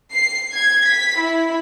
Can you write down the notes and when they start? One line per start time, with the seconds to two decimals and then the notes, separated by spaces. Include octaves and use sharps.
0.13 C7
0.54 G#6
0.88 B6
1.21 E4